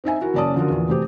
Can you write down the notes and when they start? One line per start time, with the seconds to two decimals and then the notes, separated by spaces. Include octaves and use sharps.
0.04 C4 D#4 E5 G#5
0.21 E4 F#4 A#4
0.34 F#1 C#4 D5 A5 D#6
0.56 D3 F3 F#4 A#4
0.70 E2 A#2
0.89 F1 C4 G4